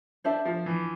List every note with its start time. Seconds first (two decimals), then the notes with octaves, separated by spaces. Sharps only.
0.24 D4 A4 C5 E5 A5
0.45 F3
0.66 E3